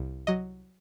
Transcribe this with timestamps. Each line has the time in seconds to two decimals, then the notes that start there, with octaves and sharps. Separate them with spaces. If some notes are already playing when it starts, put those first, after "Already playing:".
Already playing: C2
0.27 F#3 D#5